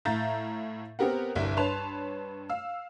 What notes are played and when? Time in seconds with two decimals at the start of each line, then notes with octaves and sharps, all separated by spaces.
0.05 A2 E5 F5 A#5 G6 A6
0.99 B3 C4 G4 A#4 F#5
1.36 G1 C2 E5
1.57 G2 B4 C#5 A5 C6 F7
2.50 F5 E6